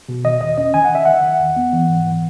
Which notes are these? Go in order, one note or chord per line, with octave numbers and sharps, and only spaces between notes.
B2
D#3 D#5
E2 D#5
C#4 D#5
D#3 G#5
F#5
D#3 E5
D#3 F#5
D#3
E2
B3
E3
G#2
E3